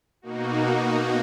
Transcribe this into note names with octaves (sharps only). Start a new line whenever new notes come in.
B2 A#3 D#4 F#4